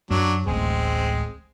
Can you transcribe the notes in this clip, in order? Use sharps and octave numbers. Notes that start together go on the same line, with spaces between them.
F#2 F#3 D4
D1 A1 G#3 C4 G#4